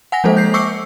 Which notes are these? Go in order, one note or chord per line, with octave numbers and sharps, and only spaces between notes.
F#5 G#5 A#6
F3 G#3 A#3 A4 C5
G6 C7
C#6 D6 E6 C7 C#7